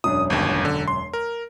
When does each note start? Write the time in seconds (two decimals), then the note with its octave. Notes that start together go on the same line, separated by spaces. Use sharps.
0.04 E1 F#2 D4 D#6
0.30 G1 D#2
0.65 D3
0.88 C6
1.13 A#4